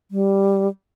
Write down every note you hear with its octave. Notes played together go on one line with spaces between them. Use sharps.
G3